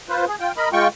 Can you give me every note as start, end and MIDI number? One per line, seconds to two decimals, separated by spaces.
0.09 0.25 65
0.09 0.25 71
0.09 0.25 72
0.28 0.35 68
0.40 0.52 65
0.40 0.52 79
0.57 0.69 70
0.57 0.69 75
0.57 0.69 83
0.73 0.88 56
0.73 0.88 65
0.73 0.88 79
0.73 0.88 85